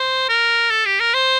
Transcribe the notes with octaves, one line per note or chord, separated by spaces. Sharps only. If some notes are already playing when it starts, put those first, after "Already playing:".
Already playing: C5
A#4
A4
G4
A#4
C5